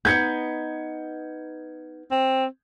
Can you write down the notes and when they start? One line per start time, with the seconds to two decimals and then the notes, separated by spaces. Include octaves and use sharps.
0.05 B3 D#4 G6 G#6 C#7
2.11 C4